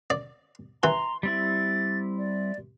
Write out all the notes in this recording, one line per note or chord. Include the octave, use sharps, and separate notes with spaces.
D5
E3 A#5 C6
G3 C4 E4 A6
D5